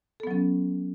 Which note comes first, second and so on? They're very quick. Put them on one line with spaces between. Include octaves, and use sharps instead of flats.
A4 B3 F#3 C#4